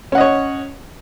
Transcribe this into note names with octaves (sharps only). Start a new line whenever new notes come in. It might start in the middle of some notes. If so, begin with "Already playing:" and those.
C#4 C#5 D#5 F#5